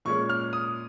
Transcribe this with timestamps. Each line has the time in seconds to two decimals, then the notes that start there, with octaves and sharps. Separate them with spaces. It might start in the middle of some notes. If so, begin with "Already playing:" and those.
0.05 A#2 G#3 C#4 C#6
0.29 F6
0.53 D#6